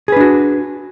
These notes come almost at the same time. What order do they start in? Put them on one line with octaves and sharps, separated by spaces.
G#4 B4 D4 F#4